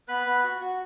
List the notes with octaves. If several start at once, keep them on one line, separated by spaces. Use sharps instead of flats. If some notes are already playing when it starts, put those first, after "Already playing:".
B3 B4 B5
B3
F#4
F#4